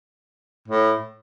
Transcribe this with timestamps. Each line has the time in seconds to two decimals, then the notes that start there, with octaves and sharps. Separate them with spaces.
0.68 A2